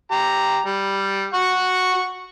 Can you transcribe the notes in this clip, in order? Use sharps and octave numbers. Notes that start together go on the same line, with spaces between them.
G4 A#5
G3
F#5 C#6